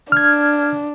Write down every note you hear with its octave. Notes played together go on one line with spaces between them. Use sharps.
D4 F6 G#6